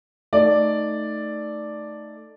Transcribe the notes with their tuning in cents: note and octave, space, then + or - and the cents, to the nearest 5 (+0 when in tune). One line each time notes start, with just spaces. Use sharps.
A3 +0 D#4 +0 D5 +0